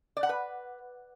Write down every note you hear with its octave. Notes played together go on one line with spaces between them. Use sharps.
D5
F#5
B4